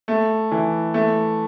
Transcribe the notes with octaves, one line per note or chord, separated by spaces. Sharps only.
A3
E3
A3